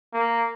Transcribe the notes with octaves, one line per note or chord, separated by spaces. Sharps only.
A#3